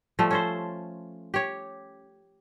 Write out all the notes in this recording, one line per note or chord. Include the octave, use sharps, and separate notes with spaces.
F3 G3 A3
C#4 A4 C5
G4 C#5